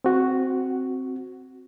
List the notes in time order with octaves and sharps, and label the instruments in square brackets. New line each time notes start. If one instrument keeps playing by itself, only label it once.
[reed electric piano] C4 F#4